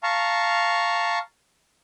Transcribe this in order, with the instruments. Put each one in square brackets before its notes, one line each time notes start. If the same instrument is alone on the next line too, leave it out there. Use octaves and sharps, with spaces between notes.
[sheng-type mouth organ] F5 A5 A#5 C#6